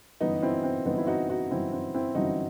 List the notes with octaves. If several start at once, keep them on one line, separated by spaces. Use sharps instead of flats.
G1 F#2 E3 B3 D#4
C4 E4
C4
G1 F#2 E3 B3 D#4
E4
D#4 F#4
D#4 F#4
G1 F#2 E3 C4 E4
C4
C4 E4
G1 F#2 E3 D#4 F#4